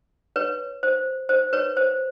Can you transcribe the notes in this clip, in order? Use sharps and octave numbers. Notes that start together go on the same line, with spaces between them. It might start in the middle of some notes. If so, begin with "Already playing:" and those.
B4 C#5
C5
C5
B4 C#5
C5